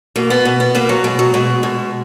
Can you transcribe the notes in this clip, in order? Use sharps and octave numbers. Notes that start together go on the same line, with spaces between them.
B2 A#3
B3
B2
B3
B2 A#3
F#3
B2 G#3
F#3
B2 G#3
B2